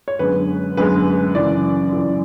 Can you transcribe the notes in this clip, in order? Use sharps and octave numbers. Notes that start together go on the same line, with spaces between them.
C#5
F#2 D3 G#3 B3 B4
F#2 D3 G#3 B3 B4
F#2 C#3 E3 D5
F#2 C#3 E3